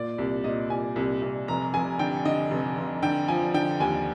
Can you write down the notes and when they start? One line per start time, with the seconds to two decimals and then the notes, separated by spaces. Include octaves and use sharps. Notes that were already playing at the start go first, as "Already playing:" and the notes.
Already playing: A#2 D5
0.18 C2
0.44 A#2 D#5
0.70 C2 G#5
0.96 C2
1.21 C2
1.48 F1 A#5
1.74 F1 G#5
1.99 D3 G5
2.25 D3 D#5
2.51 F1
2.78 F1
3.03 D3 G5
3.28 F3 G#5
3.54 D3 G5
3.80 D#2 G#5